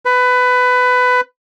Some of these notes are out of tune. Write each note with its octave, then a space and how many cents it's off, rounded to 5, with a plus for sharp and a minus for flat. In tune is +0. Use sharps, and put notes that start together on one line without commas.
B4 +20